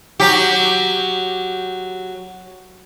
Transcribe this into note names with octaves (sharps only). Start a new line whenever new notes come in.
F#3 G4